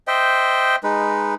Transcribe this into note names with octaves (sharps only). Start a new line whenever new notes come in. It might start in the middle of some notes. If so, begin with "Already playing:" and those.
C5 D#5 E5 G5
G#3 D#4 B4